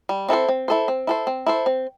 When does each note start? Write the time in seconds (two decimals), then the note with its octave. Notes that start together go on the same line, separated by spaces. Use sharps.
0.09 G3
0.29 C4 E4 A4 C5
0.48 C4
0.68 E4 A4 C5
0.88 C4
1.07 E4 A4 C5
1.27 C4
1.46 E4 A4 C5
1.66 C4